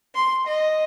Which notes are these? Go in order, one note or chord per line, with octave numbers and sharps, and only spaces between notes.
C6
D#5